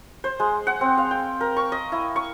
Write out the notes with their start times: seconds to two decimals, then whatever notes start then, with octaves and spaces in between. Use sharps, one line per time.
0.24 C5
0.40 G#3
0.67 F#5
0.81 C4
0.98 F5
1.11 G5
1.41 A#4
1.57 C#6
1.72 D#5
1.92 E4
2.16 C#6